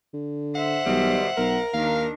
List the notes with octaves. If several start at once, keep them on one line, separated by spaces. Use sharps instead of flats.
D3
C5 E5 F#5
B1 B2 D#3 G3
B1 A#4
D#2 D#3 D4 F5